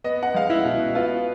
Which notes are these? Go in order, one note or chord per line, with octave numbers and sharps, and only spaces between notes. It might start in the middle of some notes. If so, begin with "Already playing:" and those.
B3 D#5
F#5
G#3 F5
E4 E5
B2
B3 F4 F5